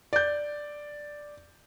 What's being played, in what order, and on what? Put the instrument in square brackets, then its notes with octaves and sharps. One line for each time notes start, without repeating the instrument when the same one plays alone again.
[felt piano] D5 G6